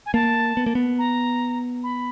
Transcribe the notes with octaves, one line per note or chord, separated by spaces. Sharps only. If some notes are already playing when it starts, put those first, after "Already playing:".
G#5
A#3 A5
B3
A#3
B3
A#5
B5